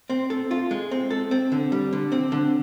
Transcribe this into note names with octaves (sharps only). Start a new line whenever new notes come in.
C4
A4
F4
G#3
C4
A4
C4
D3
G3
D3
C4
D3